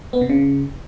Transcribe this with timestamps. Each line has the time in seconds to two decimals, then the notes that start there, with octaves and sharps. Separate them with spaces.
0.13 B3
0.21 C3
0.30 C#3